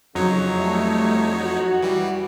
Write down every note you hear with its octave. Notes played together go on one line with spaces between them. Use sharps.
F2 C#3 F#3 D#4 C#5
G3 A3
F#4
E3 G3